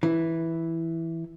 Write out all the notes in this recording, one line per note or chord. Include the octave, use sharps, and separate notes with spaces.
E3